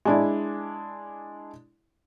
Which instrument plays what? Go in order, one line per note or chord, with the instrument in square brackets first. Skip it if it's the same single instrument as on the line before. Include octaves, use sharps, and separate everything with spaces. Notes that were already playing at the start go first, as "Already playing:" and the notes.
[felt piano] G#3 D4 E4